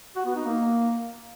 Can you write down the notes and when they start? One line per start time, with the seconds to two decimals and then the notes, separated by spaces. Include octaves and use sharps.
0.16 F#4
0.25 B3
0.35 D#4
0.45 A#3